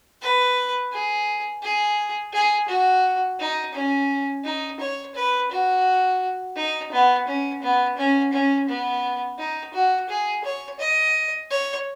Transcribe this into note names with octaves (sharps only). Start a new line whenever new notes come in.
B4
G#4
G#4
G#4
F#4
D#4
C#4
D#4
C#5
B4
F#4
D#4
B3
C#4
B3
C#4
C#4
B3
D#4
F#4
G#4
C#5
D#5
C#5